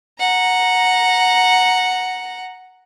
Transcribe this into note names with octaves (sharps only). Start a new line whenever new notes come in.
F#5 A#5